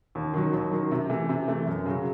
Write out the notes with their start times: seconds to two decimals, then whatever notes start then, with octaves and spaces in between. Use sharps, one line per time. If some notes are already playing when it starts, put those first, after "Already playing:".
0.15 D#2
0.34 D#3 F#3
0.53 D#2
0.71 D#3 F#3
0.91 C3
1.10 E3 A3
1.29 C3
1.48 E3 A3
1.67 F#2
1.86 C#3 F#3